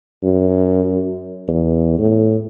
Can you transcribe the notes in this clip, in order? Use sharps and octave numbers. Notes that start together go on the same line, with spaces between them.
F#2
E2
A2